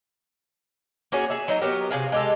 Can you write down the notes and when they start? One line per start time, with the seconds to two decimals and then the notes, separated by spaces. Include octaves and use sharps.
1.12 A#3 C#4 F#4 G#4
1.30 G#4 E5
1.48 F#3 D#4 A#5
1.62 F#3 B3 G4 A#4
1.91 C3 G4 G#4 F5
2.12 G#3 G4 A4